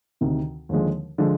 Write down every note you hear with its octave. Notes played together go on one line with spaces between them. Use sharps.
D2 C3 D#3
D#2 D3 F3 G#3
D3 F3 G#3